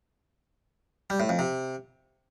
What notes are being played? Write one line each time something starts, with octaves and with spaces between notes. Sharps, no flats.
G3
A2
F2
C3